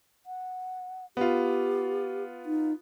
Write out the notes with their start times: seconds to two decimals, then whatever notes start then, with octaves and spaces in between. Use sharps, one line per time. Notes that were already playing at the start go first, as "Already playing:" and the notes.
0.26 F#5
1.17 B3 F4 G4
2.46 D#4